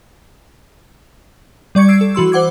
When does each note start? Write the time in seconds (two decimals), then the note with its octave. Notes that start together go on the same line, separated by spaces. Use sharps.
1.75 G3 D5 C#6 G#6 C#7
1.88 E6 G#6 C7 D7
2.01 A4
2.15 E3 F#4 C6 E6
2.32 C5 F#5 D6 G#6